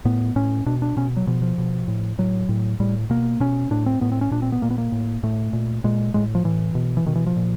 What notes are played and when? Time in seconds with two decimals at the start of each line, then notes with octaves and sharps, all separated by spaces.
0.05 A2 B3
0.36 A2 C#4
0.66 B2 D4
0.82 D4
0.97 B2 C#4
1.17 F#3
1.27 B2 F3
1.42 F3
1.58 B2
1.88 A2
2.18 A2 F#3
2.49 A2
2.80 A2 G3
3.10 B2 A#3
3.40 B2 C#4
3.71 A2 D4
3.86 C4
4.01 A2 B3
4.12 C4
4.21 C#4
4.31 A#2 D4
4.42 C4
4.52 B3
4.62 A#2 A#3
4.71 B3
4.78 A#3
4.92 A2
5.23 A2 A3
5.53 A#2
5.84 A#2 G#3
6.14 A2 G#3
6.35 F3
6.44 A2 E3
6.75 B2
6.97 E3
7.06 B2 D#3
7.15 E3
7.26 F3
7.36 A#2